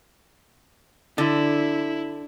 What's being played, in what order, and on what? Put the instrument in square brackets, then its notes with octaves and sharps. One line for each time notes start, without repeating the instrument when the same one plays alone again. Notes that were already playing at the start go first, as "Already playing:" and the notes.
[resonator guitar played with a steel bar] D3 [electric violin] E4